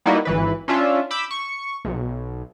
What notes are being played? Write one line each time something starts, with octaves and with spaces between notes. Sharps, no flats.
G3 A#3 B3 D#4 E4 F#4
G#1 E3 B4
C#4 D4 F4 E5
B5 D6 E6 G6
C#6
B1